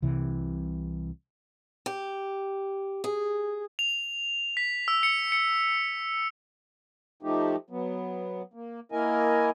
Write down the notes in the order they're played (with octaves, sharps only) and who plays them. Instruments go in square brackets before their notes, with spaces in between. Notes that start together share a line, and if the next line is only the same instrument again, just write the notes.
[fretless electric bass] C2 C3 E3
[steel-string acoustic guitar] G4
G#4
[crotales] F7
B6
E6
C#7
C#7
[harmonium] F3 A3 D#4 G4
F#3 B3
A#3
A#3 E4 A#4 D#5 G#5